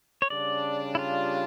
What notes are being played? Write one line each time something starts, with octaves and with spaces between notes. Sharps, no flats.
C#5
C#3 G3 D4 D5
E4
F4